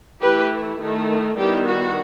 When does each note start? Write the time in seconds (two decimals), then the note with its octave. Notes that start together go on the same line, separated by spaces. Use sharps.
0.21 E3 A3 E4 G4 B4
0.79 D#3 A3 E4
1.36 D#3 G3 B3 E4 G4
1.65 F#4